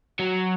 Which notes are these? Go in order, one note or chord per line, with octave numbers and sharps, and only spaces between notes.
F#3